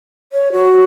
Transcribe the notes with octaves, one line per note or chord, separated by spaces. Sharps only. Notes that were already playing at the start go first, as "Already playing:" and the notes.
C#5
F#4